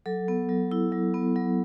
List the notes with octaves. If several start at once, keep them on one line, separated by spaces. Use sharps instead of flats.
F#3 A4
B3
F#3
E4
F#3
B3
F#3